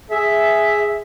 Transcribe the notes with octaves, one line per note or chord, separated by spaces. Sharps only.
G#4 E5